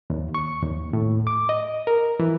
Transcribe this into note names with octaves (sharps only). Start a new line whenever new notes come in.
D#2
C#6
D#2
A2
D6
D#5
A#4
E3